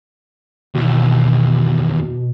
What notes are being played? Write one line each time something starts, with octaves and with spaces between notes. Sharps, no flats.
D#2 B2 E3